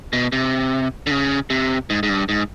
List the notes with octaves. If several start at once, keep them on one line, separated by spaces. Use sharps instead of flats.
B2
C3
D3
C#3
C3
G#2
G#2
G2
G#2